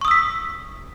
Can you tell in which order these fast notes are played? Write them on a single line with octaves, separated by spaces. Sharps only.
C#6 D#6 E6 B6